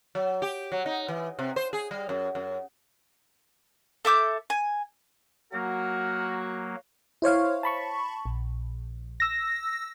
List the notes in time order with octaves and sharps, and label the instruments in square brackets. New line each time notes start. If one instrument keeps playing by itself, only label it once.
[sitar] F#3
G4
F#3
D#4
E3
C3
C5
G#4
G3
F#2
F#2
[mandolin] A4 E5 D6 G6
G#5
[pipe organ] F#3 A#3 [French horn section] F#4 [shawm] A#4
[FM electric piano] E4 C5 C#5 F5
A5 B5 C#6
A#1
E6 A#6